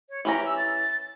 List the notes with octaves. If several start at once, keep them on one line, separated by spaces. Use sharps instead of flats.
C#5
E3 C#4 G4 A#5
E6
A6